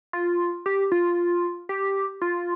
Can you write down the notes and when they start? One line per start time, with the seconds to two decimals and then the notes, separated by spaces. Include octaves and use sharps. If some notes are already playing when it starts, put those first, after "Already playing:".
0.13 F4
0.66 G4
0.92 F4
1.69 G4
2.22 F4